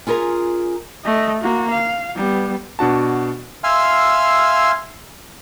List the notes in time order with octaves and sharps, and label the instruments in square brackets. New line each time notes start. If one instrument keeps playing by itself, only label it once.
[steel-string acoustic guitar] C#4 F4 G#4 A#4 A#5
[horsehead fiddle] A3 D#5
A#3 F#4
F5
G3 B3
[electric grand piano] B2 D4 F#4 A5
[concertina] E5 F5 G#5 C6 E6 F6